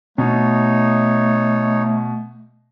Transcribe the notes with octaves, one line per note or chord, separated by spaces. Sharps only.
B2 A3 D#4 C#5